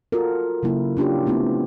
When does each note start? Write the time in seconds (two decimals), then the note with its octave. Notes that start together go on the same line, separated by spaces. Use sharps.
0.12 F4 F#4 A4 A#4
0.63 C#3 F#3 A#3 E4
0.97 C#4 D4 F4 G4
1.26 A3 B3 C4 E4